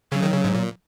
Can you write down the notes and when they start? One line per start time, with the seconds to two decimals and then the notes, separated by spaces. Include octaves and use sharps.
0.12 C#3 F#3
0.23 D#3
0.33 C#3
0.44 G#2
0.54 A#2